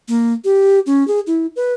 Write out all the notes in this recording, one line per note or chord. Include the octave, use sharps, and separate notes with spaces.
A#3
G4
C#4
G#4
E4
B4